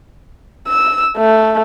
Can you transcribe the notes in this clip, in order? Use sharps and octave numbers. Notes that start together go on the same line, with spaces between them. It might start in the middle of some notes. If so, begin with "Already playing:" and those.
E6
A3